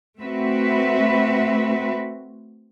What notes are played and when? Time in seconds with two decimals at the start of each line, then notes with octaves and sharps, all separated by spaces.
0.20 A3 C4 F#4 B4 E5